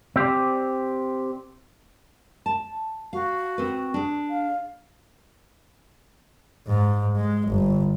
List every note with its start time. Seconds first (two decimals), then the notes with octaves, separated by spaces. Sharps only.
0.16 C4 G4 C5 D5
2.46 A5
3.13 F#4 F5
3.58 C4 B4
3.94 D4 G#4
4.30 F5
6.67 G#2
7.16 G#3
7.47 G1